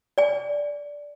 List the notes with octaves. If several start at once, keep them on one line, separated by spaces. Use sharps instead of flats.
D5 G#5